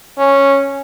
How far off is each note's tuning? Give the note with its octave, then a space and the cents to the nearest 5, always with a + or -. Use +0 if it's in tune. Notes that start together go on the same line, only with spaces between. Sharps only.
C#4 -5